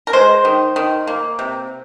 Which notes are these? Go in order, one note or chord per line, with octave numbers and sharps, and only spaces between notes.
A#4
G#3 C5
D#3
D#3
A#3
C3